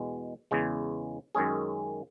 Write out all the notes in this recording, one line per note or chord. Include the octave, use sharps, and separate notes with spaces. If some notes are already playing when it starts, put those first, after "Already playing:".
Already playing: E2 B2 G#3
E2 C#3 G#3
F#2 D#3 G#3 C#4 G#4